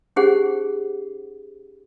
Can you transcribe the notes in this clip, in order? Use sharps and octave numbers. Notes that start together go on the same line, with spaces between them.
C#4 D#4 G4 G#4 C5 F#5